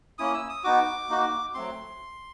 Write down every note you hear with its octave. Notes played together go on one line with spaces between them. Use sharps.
A#3 C#4 E4 D#6
E6
D#6
B3 D#4 F#4 D6
A#3 D#4 F#4
F#3 A3 C4 C6